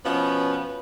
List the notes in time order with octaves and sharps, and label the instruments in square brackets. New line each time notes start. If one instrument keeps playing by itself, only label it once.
[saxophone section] B2 F3 B3 C#4